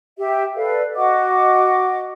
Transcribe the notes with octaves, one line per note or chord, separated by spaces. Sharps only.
G4 E5
A4 B4 D5 F5
F#4 D#5 F#5 D6